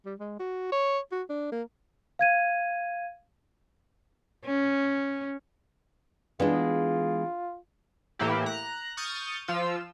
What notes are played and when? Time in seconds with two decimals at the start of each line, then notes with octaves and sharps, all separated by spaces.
0.05 G3
0.20 G#3
0.39 F#4
0.72 C#5
1.12 F#4
1.29 D4
1.52 A#3
2.19 F5 G#6 D#7
4.45 C#4
6.40 E3 G#3 B3 D4 F4
8.19 A2 E3 A#3 E4 G4
8.46 A#5 F#6
8.97 C#6 D#6 F6 G6 A6
9.48 F3 F4 E6